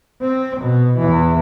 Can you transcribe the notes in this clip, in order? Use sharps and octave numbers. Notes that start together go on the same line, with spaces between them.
C4
B2
E2 E3